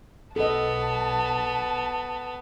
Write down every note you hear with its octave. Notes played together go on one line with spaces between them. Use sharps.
B1 B3 A4 D#5 A5